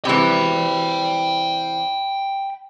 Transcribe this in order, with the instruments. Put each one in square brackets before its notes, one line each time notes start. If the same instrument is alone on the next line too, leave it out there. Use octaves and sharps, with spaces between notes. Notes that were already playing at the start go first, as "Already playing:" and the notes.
[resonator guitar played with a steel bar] C3 E3 [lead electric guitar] G5 B5